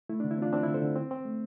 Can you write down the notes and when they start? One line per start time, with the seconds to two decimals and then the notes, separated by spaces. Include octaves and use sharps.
0.09 A3 E4
0.20 D3 D4
0.31 E4
0.38 C4 D4 F4
0.53 C4 D4
0.63 D3 E4
0.74 A4 C5
0.82 D3
0.96 C4
1.11 C4
1.25 A3